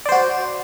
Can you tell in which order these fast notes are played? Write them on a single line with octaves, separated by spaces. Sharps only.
D5 C5 F#4